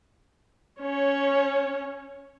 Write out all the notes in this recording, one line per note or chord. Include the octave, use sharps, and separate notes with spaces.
C#4 C#5